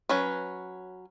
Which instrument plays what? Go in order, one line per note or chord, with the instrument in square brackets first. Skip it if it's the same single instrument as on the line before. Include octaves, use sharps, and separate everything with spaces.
[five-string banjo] F#3 C#4 B4